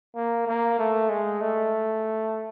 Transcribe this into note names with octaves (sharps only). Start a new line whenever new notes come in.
A#3
A#3
A3
G#3
A3